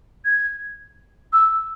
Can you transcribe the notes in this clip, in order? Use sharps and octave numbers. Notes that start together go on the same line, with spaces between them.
G#6
E6